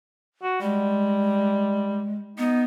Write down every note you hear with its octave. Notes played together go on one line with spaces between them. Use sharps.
F#4
G3 G#3
B3 D#4